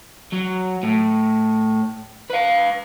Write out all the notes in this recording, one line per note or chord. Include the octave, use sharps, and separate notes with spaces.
F#3
A2
B4 F5